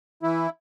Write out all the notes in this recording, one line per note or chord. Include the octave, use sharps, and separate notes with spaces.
E3 E4